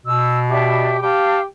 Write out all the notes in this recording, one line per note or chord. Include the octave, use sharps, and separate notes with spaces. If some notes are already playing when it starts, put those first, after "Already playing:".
B2 E6
D4 G4 E5
G4 F5 A5